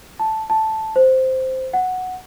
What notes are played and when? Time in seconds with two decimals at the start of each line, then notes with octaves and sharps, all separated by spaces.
0.19 A5
0.50 A5
0.96 C5
1.73 F#5